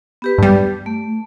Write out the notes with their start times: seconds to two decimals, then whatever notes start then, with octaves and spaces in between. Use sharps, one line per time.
0.22 B3 G4 B4
0.38 G2 G3
0.86 A3